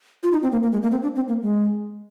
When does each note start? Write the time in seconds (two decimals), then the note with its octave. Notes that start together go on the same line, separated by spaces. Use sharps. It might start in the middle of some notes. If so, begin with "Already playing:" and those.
0.23 F4
0.32 D#4
0.43 C4
0.52 A#3
0.63 A#3
0.72 G#3
0.82 A#3
0.91 C4
1.02 D4
1.15 C4
1.28 A#3
1.42 G#3